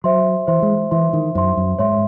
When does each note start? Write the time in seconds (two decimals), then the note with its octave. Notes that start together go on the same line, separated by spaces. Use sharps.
0.04 F#3 C5 E5 C6
0.47 E3 C5 E5 C6
0.62 G#3
0.91 E3 C5 E5 C6
1.13 D#3
1.35 F#2 C5 E5 C6
1.57 F#2
1.79 G#2 C#5 E5 C6